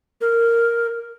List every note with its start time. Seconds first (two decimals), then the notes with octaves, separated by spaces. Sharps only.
0.21 A#4